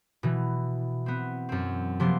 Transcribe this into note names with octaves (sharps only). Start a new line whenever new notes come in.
B2 E3
B3 C4
F#2 C4
C3 F3 A#3 B3 C6